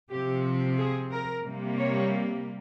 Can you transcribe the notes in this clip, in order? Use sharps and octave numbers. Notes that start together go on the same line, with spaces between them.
C3 F3 C4 G4
G#4
A#4
C3 G3 A#3
C#5